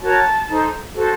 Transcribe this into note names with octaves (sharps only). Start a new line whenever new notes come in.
F#4 A#4 C#5 A5
D#4 A4 C5
F#4 A4 C5